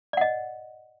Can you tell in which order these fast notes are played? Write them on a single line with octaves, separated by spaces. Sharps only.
D5 F#5 D#5